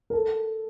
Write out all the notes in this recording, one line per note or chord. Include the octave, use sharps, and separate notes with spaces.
A#4
A4